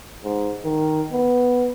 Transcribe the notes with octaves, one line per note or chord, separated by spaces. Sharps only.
G#2
D#3
B3